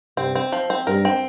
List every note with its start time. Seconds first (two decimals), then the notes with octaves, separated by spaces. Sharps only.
0.17 G2 C3 C4
0.35 C4
0.52 F3
0.70 C4
0.87 G2 A#4
1.05 C4